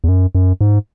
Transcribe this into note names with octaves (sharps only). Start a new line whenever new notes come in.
E2
F#2
F#2
G#2